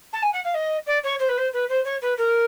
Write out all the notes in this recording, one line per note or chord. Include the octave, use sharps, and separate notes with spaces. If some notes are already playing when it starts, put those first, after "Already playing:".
A5
G#5
F#5
F5
D#5
D5
C#5
C5
B4
C5
B4
C5
C#5
B4
A#4